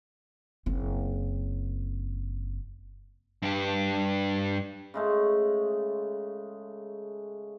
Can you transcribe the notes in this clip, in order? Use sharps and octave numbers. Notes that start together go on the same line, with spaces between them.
F#1 C4
G2 G4
C#3 G#3 A3